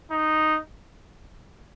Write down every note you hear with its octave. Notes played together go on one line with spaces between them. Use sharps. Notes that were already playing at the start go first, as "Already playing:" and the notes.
D#4